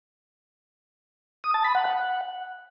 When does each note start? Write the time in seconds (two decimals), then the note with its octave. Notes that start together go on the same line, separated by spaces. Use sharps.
1.44 D#6
1.54 A5
1.64 B5
1.75 F#5
1.85 F#5